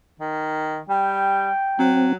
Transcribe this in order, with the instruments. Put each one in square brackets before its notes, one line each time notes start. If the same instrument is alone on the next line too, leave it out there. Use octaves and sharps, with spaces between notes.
[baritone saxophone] D#3
[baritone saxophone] G3 [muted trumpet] G5
[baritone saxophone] F#3 [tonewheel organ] C4